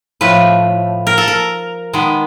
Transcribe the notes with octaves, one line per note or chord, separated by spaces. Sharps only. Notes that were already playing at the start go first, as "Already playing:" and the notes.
A2 F3 A3 B4
A#4
A4
A#4
D#3 G#3 B3